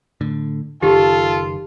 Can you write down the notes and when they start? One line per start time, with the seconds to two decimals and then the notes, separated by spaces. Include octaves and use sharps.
0.21 A2 D3
0.82 F#1 D#3 F4 G4 A4